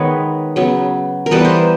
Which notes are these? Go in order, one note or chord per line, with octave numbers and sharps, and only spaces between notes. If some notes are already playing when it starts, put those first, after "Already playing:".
Already playing: D#3 G#3 B3 B4 C#5
C#3 F#3 B3
A#4
E3 G3 B3 A4 B4
A#4 C5